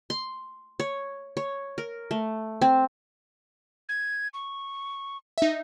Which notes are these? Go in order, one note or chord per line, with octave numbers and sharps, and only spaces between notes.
C6
C#5
C#5
A#4
A3
C4
G#6
C#6
D#4 E5